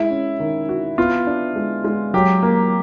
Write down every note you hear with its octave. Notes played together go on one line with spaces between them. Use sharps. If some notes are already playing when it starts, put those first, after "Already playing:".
Already playing: G#3 E4
C#4
D#3
F#4
B3 F4
D4
G#3
G#3
F#3 G4
A#3